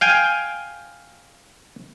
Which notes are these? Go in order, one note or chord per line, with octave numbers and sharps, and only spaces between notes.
F5 G5 G#5